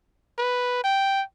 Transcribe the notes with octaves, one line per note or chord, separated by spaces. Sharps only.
B4
G5